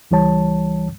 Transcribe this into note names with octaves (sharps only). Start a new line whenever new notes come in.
C#2 E3 G3 C#5 A5